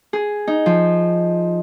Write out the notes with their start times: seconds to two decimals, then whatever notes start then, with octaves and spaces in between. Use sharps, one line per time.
0.13 G#4
0.47 D#4
0.66 F3